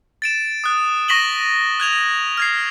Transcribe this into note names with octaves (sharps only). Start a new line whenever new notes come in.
A6 D7 E7
D#6 F#6
C#6 A#6 B6 E7 F#7 G7
F#6 G#6 F7
F6 G#6 C7